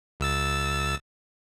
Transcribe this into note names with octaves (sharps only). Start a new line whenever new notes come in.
C#2 E6 A6